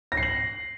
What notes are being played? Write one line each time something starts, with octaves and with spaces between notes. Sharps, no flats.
A#6
C7
F#7